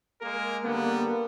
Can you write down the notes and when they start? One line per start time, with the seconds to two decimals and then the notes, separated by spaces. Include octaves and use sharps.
0.21 G#3 A#3 A#4
0.64 D3 G3 A#3 B3